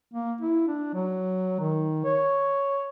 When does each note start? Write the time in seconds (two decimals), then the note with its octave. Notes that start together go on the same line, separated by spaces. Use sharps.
0.14 A#3
0.41 E4
0.68 D4
0.94 F#3
1.60 D#3
2.05 C#5